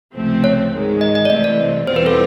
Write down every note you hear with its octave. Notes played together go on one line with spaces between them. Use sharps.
C#2 C3 F3 A3 C4
C#5
G#2 D#3 G#3
D#5
D#5
D5
C2 C3 E3 A3 C4 D#5
D5
E2 B2 G3 C4 F4 C5
B4
A4